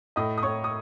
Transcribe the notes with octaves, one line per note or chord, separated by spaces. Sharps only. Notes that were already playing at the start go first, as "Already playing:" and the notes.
A2 D#5 D#6
D#6
A2 C#5 C#6
D#6